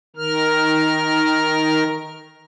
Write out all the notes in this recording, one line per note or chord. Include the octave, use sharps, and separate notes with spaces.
D#3 A#4 F6